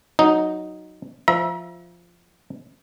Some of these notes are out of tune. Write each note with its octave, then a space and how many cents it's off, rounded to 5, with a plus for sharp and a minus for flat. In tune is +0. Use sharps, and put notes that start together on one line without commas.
F#3 +0 D#4 +0
F3 -5 E5 +0 A#5 +40